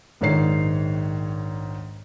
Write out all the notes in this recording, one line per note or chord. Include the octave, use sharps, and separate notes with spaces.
A#1 G#2 D#3 C#5 C7